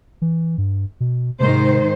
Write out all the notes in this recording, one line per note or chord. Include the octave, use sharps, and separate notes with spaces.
E3
G2
B2
G#2 C3 D#3 C5